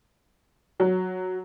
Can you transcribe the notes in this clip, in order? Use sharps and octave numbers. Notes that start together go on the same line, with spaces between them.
F#3